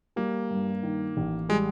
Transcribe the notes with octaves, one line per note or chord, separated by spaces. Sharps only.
G3 A#3
G2
D#3
A1
G3 G#3